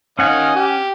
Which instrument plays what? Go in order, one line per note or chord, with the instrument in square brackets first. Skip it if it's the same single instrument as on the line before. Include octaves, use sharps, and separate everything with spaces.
[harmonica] D#3 D#5 F5 [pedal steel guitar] C#4 F#5 G#5
[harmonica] G4